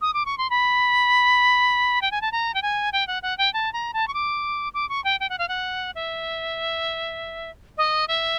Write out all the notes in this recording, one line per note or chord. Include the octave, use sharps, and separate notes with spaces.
D#6
D6
C#6
C6
B5
G5
G#5
A5
A#5
G5
G#5
G5
F#5
F#5
G5
A5
A#5
A5
C#6
D6
D6
C#6
G5
G5
F#5
F5
F#5
E5
D#5
E5